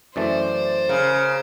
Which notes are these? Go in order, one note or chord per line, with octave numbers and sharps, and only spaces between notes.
F#2 E3 A3 C5 D5
C#3 A#4